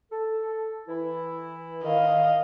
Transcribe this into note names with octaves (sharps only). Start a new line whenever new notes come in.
A4
E3 E4
D#3 D#5 F5